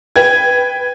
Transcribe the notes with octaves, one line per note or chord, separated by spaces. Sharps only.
B4 G5 G#6